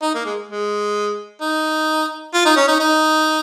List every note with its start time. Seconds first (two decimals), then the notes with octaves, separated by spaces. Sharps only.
0.02 D#4
0.15 A#3
0.26 G#3
0.49 G#3
1.41 D#4
2.34 F4
2.45 D#4
2.56 C#4
2.68 D#4
2.80 D#4